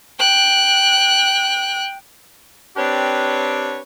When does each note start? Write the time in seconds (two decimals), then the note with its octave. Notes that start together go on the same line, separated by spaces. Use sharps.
0.20 G5 F#6
2.77 C4 D4 G4 B4 C#5 D5